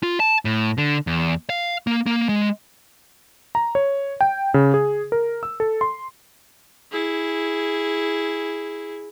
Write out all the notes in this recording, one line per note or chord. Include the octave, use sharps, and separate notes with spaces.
F4
A5
A2
D3
E2
F5
A#3
A#3
G#3
A#5
C#5
G5
C#3
G#4
A#4
E6
A4
C6
E4 G#4